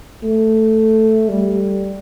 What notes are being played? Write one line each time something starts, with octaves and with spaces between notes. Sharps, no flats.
A3
G3